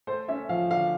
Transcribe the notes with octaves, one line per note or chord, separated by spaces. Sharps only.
A3 C5
C#4 E5
F3 F5
D3 F5